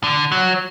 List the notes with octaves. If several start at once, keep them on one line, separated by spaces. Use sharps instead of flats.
D3
F#3